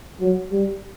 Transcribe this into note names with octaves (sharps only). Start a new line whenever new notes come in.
F#3
G3